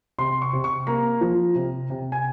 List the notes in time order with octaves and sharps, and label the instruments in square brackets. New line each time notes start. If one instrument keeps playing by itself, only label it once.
[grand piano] C3 C6
C#6
C3
C#6
A#3 A#5
F3
C3
C3
G#5